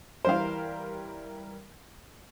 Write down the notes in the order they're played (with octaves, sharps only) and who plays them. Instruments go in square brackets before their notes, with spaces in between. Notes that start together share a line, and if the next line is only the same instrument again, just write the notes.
[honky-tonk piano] E3 G3 A#4 [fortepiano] C5 F5